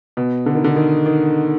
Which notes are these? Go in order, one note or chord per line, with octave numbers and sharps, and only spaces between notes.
B2
D3
D#3
D3
D#3
D#3